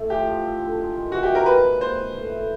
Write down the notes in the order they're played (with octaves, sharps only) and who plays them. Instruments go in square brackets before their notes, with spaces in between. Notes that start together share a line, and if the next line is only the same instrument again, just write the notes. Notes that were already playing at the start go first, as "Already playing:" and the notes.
Already playing: [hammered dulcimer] A2
[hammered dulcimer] F3 [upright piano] G4
[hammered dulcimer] F3
C4
D3
G#3
D#3
[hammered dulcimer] E3 [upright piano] F#4
[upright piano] G4
[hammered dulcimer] G#3
[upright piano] A#4
[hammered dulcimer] A#3 [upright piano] B4
[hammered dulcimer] G#2
[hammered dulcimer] A#3 [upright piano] C5
[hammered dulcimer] B2
A2
A2